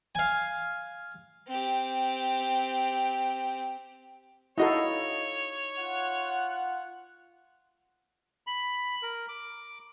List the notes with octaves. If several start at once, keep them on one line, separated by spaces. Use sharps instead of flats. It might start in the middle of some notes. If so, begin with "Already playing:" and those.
F5 G#5
C4 G4
D#4 E4 F#4 A4 C#5 D#5 F5
F4 F#5
B5
A#4
D6